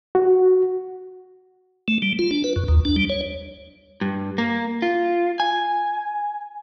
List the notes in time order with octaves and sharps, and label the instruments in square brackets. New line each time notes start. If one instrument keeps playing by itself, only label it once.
[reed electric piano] F#4
[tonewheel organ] A3
G3
F4
D4
B4
F#2
D#2
D4
G3
C#5
[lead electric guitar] G2
A#3
F4
G#5